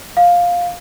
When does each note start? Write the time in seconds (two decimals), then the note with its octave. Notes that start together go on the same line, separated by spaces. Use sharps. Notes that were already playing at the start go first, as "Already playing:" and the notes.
0.17 F5